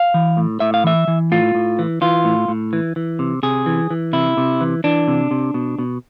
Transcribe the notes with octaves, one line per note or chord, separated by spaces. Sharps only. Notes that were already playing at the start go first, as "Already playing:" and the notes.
Already playing: F5
E3
A2
A2 E5
F5
E3 E5
E3
A2 F4
A2
E3
E3 F4
A2
A2
E3
E3
C3
C3 G#4
E3
E3
C3 E4
C3
E3
E3 D4
C3
C3
B2
B2